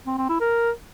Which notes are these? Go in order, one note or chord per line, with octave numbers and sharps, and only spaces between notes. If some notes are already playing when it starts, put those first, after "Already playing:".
C4
C4
E4
A#4